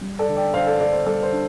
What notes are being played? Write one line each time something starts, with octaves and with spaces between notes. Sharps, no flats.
G3
A4 D5
D3
D5 G5
D3 C5 F5
A4 D5
D3 A4 D5
C5
G3 A4 D5
C5
D4